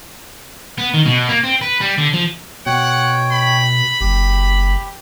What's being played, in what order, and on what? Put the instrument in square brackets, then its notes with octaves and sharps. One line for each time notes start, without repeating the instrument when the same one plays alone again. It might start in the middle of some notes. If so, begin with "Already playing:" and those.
[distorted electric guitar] B3
D#3
B2
A#3
C4
B4
G3
D3
F3
[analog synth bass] B2 [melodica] C#5 G5 [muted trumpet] F#5
[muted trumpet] B5
[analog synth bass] F#1 [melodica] G4